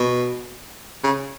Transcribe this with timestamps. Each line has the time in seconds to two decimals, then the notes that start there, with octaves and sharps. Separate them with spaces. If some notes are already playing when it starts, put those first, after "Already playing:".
Already playing: B2
1.04 C#3